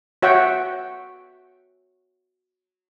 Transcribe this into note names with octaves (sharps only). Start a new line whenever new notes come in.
F#4 C#5 E5 F#5 G5